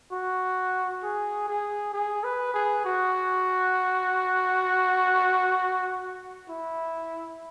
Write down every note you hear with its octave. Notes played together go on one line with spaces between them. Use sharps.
F#4
G#4
G#4
G#4
B4
G#4
F#4
E4